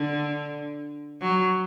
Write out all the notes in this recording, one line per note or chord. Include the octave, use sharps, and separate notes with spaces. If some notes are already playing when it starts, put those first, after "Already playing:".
Already playing: D3
F#3